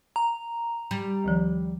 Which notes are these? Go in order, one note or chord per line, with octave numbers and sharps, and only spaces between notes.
A#5
G3
D2 D#3 F3